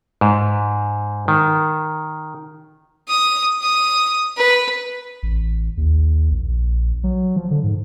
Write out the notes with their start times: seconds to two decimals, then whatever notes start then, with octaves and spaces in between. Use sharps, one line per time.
0.21 G#2
1.28 D#3
3.08 D#6
3.61 D#6
4.37 B4
5.23 A1
5.77 D#2
6.31 A#1
7.04 F#3
7.36 F3
7.51 D3
7.64 G#2